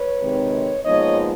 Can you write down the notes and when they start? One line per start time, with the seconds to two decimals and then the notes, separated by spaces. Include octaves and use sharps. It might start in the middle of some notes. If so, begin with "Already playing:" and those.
Already playing: B4 C#5
0.21 C3 D#3 G#3 C4 D#4
0.84 A#2 F3 G#3 B3 D#4 C#5 D#5